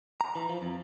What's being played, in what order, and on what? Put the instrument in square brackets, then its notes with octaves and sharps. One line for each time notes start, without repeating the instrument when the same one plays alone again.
[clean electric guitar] A#5
E3
F3
F2